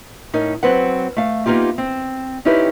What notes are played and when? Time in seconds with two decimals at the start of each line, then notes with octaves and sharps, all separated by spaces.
0.33 A2 C#4 D#4 A#4
0.63 F#3 C4 B4 F#5
1.16 A3 F5
1.46 A#3 B3 D#4 F4 G4
1.78 C4
2.45 C4 C#4 D#4 E4 G4 B4